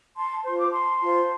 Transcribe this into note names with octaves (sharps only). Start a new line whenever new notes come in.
A5 C6
F4 C5 C6
D6
A5 C6
F4 C5